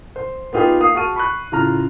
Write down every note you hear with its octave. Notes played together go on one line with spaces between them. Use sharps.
C5
B3 D#4 F4 G4 G#4
A#3 F5 D#6 C7
F#4 G#4 A5 C#6 F6 D#7
B5 C#6 F#6
A2 C#3 F4 A#5 F6